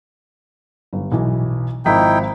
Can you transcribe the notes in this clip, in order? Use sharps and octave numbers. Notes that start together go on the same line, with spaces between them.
G1
B1 E3
G#1 F3 D#4 E4 G5 B6